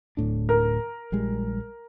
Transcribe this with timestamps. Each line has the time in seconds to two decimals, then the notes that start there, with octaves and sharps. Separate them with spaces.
0.17 D1 A2 D4
0.49 A#4
1.12 A#1 G3 G#3